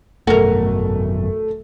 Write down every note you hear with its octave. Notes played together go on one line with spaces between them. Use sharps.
G#1 F#2 B2 A3 F#4 A#4